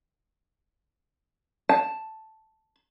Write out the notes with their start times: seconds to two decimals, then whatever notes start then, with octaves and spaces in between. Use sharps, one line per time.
1.69 A5